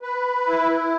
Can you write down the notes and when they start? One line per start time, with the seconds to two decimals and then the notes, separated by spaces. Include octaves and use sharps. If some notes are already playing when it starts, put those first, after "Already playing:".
0.02 B4
0.47 E4